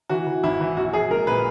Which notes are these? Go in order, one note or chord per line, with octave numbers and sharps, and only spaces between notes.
E3 F#4
E3
G#1 E4
E3
A#1 F#4
A#1 G#4
G#3 A#4
A#2 B4